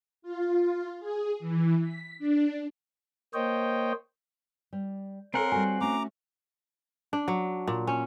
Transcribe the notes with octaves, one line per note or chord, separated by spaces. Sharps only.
F4
G#4
E3
B6
D4
A#3 C5 C#5 D#5 G5
G3
C4 A4 A#4 C#5 F#5 G#5 A#5 C6
G3 F#4 G#5
A3 C#4 F#4 A#5 D6
D4
F#3
A#2
C#4